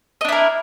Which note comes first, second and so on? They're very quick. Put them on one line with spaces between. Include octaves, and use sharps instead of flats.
D#5 D4 E4 A#4